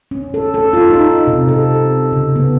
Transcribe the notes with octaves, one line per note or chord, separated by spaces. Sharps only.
C#4
A4
A4
F4
D#4
C3
A4
C#3
B3